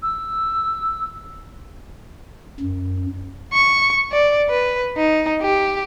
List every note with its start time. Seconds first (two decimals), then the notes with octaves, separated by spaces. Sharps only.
0.03 E6
2.60 F#2
3.53 C#6
4.12 D5
4.50 B4
4.97 D#4
5.42 G4